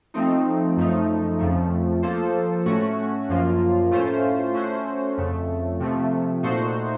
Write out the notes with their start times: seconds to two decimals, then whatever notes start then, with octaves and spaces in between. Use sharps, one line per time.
0.14 F3 A3 C4 D#4
0.77 F#2 F3 A3 D#4
1.39 F2 C#3 F3 A3
2.03 F3 A#3 F4 A4 C5
2.66 A2 A3 C#4 F#4
3.29 F#2 F3 A#3 F4
3.91 A2 A3 C#4 F4 C5
4.55 A3 C#4 F#4 C5
5.18 F2 C#3 A3
5.80 C3 F3 A3
6.43 A#2 A3 D#4 F#4 C5